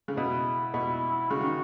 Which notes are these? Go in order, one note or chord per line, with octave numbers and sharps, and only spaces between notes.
C#3
B2 E4
B2
C#3 F#4
D#3